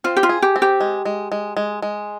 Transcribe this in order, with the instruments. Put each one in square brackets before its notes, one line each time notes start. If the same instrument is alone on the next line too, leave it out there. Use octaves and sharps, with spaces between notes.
[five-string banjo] C4 [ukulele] F4
[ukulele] G4
F4
[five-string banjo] G#4
[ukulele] G4
[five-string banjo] C4
[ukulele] G4
[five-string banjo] G#3
G#3
G#3
G#3
G#3